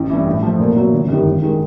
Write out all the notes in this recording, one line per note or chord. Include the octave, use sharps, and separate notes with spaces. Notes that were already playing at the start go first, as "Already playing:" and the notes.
Already playing: A1
G2 E3
A2
F3 A3
A#2
F#3 B3
G1
F#2 D#3 G3
G#1
D#3 G#3